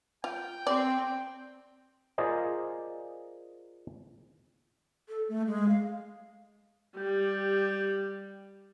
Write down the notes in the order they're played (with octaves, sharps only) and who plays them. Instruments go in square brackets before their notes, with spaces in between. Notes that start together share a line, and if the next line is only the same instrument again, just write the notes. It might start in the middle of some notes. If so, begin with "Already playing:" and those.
[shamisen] F4 [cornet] G5
[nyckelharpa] C4 [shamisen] D5
[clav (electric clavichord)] F4 G#4 A#4 C5 D5 D#5
[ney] A4
A3
G#3
F5
[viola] G3 [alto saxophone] G4